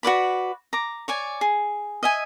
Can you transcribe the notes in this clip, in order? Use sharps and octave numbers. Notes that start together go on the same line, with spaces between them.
F#4 B4 D5 B5
A#5 D6
C#5 D5 G#5
G#4
D#5 E5 G#5